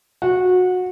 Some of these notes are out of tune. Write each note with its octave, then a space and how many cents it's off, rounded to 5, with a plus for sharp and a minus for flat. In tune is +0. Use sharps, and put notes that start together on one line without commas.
F#4 -20